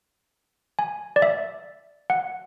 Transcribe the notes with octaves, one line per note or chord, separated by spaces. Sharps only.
G#5
D5
E5
F#5